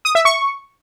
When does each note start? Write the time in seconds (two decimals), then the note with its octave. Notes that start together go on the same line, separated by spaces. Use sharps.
0.05 D#6
0.15 E5
0.25 C#6